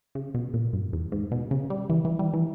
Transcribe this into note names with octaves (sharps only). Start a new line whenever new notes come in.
C#3
B2
A#2
G2
E2
G#2
B2
C#3
G3
E3
E3
G3
E3